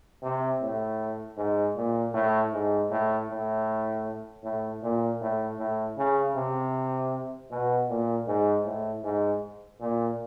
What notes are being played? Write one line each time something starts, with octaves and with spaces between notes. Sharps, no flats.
C3
A2
G#2
A#2
A2
G#2
A2
A2
A2
A#2
A2
A2
C#3
C3
B2
A#2
G#2
A2
G#2
A#2